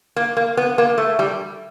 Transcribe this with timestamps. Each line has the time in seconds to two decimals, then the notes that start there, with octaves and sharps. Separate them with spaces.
0.16 A#3
0.37 A#3
0.57 B3
0.78 A#3
0.98 A3
1.19 G3